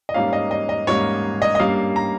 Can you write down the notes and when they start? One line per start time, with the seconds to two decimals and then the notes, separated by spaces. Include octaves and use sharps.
0.09 D#5
0.14 G#2 G3 A#3 C#4 F5
0.33 D#5
0.51 D#5
0.69 D#5
0.87 G#2 G3 A#3 C#4 C#5
1.42 D#5
1.55 D#5
1.59 G2 G3 A#3 C#4 F5
1.96 A#5